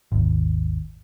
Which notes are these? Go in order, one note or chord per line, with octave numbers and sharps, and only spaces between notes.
G#1 D#2